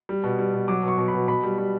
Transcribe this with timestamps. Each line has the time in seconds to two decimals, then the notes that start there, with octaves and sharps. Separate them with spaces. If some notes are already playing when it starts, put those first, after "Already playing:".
0.09 G3
0.24 B2
0.39 G3
0.54 B2
0.68 F#3 D6
0.83 B2 C#6
0.98 B2
1.08 B5
1.14 B2
1.28 B2 B5
1.43 G3
1.58 G3